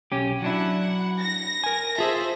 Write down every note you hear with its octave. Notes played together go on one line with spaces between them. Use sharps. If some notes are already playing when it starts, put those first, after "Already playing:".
B1 C#4 G4
F#3 D4 E4 F#5
A#6
A#4 G#5
F4 G#4 A4 C5 E5